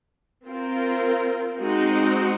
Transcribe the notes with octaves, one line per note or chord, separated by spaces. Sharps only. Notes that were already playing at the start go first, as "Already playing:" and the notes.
C4 F4 A#4
G#3 C4 D#4 F#4